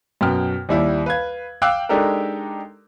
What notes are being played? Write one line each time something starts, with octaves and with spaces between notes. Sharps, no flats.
F#2 B2 G5 F6
D#2 G3 E4
B4 F5 G#6
F5 G5 D6 E6 F#6
G#3 D4 D#4 G4 A4 A#4